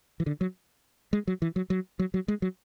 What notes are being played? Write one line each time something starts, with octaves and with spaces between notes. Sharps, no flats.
E3
D3
F#3
G#3
F#3
E3
F#3
F#3
F#3
F#3
G#3
F#3